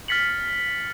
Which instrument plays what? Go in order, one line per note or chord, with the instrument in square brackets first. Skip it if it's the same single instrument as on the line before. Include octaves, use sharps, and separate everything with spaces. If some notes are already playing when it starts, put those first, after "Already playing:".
[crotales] F6 A6 B6 C#7 F#7